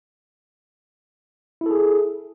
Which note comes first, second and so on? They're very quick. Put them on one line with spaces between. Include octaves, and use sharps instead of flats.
E4 A4 G#4